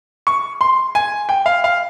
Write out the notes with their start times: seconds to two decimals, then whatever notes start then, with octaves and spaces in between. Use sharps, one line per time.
0.27 C#6
0.61 C6
0.95 G#5
1.29 G5
1.46 F5
1.64 F5